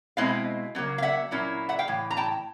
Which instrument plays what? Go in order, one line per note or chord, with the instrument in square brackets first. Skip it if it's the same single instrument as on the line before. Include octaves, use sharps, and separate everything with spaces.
[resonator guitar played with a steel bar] B2 G#3 C4 E4 D#5 F5
C#3 F#3 A#3
F5
E5 F#5
A#2 F#3 A#3 C#4 E4
E5 F#5
F5 G5
A2 E3
A#5
G5 A5